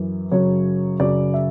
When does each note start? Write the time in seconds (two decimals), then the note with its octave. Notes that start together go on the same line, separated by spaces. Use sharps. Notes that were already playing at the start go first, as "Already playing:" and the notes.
Already playing: F#2 E3
0.31 F#2 C#3 F#3 C#5
1.00 F#2 C#3 F#3 D5
1.34 E5